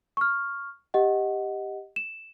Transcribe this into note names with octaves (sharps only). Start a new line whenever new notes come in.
C#6 F6
G4 D#5 F#5
E7